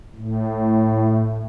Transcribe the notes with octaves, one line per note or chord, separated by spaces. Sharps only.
A2